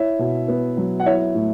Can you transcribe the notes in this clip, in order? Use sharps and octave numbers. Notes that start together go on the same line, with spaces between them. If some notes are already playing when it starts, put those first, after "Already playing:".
Already playing: E4 C#5 E5
B2
B3
F#3
F#5
E4 C#5 E5
A2